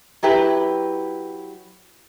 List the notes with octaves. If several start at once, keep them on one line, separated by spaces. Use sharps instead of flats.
F#3 E4 G4 B4